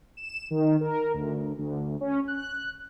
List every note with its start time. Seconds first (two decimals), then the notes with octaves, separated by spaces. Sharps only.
0.17 E7
0.50 D#3
0.81 A#4
1.14 D2
1.58 D2
2.01 C#4
2.28 F#6